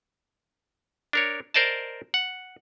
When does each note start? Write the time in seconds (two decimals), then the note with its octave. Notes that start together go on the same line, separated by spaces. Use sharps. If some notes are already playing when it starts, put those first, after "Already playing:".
1.13 D4 A#4 C#5
1.54 A#4 C5 D5 D#5 A5
2.14 F#5